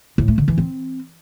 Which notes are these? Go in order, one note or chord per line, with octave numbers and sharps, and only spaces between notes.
A2
A3
D3
E3
C4